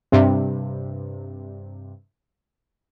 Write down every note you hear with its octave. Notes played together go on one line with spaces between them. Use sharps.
G2 C3